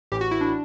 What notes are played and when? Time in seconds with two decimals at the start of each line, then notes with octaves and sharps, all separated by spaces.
0.12 A1 A2 E3 G4
0.21 F#4
0.31 E4
0.41 D4